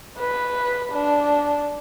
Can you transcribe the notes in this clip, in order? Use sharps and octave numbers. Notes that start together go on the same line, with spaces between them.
B4
D4